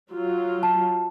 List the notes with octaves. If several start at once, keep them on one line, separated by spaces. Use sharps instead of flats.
F#3 F4
A5